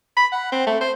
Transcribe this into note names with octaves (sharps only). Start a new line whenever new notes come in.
B5
F#5
C4
A3
C5